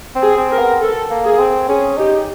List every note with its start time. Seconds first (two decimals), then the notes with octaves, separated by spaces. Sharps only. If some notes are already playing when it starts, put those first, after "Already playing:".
0.15 C4
0.23 G#4
0.37 C4
0.52 A#4
0.59 B3
0.81 A4
1.10 A#3
1.25 G#4
1.39 C4
1.68 C#4 G#4
1.98 D#4 G4